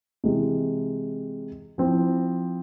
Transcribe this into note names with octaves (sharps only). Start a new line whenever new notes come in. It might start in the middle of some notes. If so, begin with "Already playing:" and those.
C3 E3 G#3
F3 C4 E4